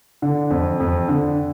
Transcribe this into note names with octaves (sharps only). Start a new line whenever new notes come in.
D3
F2
F2
D3